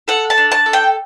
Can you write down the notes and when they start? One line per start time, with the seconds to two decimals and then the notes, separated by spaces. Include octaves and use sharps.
0.08 A4 F#5
0.30 A5
0.38 D4
0.52 A5
0.66 A4
0.73 G5